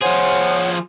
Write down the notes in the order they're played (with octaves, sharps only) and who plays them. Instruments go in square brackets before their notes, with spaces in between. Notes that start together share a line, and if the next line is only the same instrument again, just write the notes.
[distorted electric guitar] F3 G#4 [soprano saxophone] C5 [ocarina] C#5 [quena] F#5